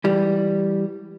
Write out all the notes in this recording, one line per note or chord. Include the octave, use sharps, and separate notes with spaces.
E3 G3